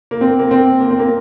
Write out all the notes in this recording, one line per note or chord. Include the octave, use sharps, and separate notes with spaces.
A#3
C4
A#3
C4
A#3
C4
A#3